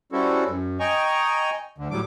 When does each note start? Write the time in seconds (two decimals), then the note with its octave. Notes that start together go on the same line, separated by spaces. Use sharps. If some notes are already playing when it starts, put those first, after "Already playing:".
0.12 G3 C4 C#4 E4 F#4 A4
0.47 F#2
0.80 D#5 G5 G#5 A#5 C#6
1.78 D2 D3
1.91 A2 F#3 G3 D6